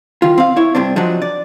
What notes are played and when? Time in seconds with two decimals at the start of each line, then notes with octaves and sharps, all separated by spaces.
0.22 D#3 F4
0.38 C4 F5
0.56 E4 C#5
0.75 G2 C3 C4 D4
0.96 F3 F#3 D4 D#4
1.22 D5